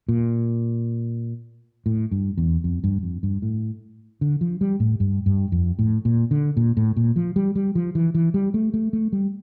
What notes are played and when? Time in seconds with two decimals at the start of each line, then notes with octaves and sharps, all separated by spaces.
0.09 A#2
1.86 A2
2.11 G2
2.38 E2
2.64 F2
2.84 G2
3.03 F2
3.23 G2
3.42 A2
4.21 D3
4.41 F3
4.61 G3
4.80 A2
5.00 G2
5.26 G2
5.52 F2
5.79 A2
6.05 A#2
6.31 D3
6.57 A#2
6.77 A2
6.97 A#2
7.16 F3
7.36 G3
7.55 G3
7.75 F3
7.95 E3
8.15 E3
8.34 G3
8.54 A3
8.74 A3
8.93 A3
9.12 G3